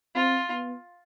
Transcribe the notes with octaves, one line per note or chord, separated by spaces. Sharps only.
C4 F4
B3